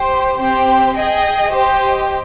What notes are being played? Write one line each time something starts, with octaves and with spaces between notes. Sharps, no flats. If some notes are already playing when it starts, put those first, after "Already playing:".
Already playing: G4 C5 G5
C4 G4 C5 G5
G#4 D#5 G5
G4 C5 D#5 G5